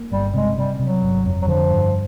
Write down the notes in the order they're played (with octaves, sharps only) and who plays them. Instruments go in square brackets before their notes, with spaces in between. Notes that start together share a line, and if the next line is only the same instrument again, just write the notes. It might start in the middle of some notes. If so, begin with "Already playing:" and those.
Already playing: [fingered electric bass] A#3
[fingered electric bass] G1 [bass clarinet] G3
[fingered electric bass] C3 [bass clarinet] G#3
[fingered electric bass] C3 [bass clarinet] G3
[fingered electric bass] C3 [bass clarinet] F#3
[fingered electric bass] G1
F2
[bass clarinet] F#3
[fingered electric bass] D3 [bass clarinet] F3
[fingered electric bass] G2